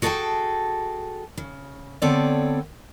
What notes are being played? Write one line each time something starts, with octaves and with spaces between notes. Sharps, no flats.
F#4 G#4 A4 F#5 G5 A5
C#3
D3 B3 C4 A4 C#5 D5